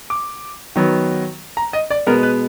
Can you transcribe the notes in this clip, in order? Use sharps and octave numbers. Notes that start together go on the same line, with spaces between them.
D6
D#3 F#3 B3
A#5
D#5
D5
B2 G#3 B3 A#4
B4